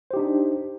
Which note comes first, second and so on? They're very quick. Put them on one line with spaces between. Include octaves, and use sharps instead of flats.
C5 G4 D#4 D4